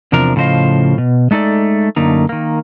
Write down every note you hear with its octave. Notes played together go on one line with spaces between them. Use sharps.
E2 C3 F3 D4 A#4
A2 C#3 F3 C5 D#5 F5
B2
G#3 A3 D#4 A4 D5
F#2 D3 A3 A#3 D#4
D#3 A#3